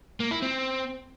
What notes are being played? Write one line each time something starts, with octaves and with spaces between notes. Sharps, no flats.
A#3
E4
C4